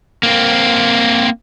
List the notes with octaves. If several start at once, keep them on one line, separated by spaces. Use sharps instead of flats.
A#3 C4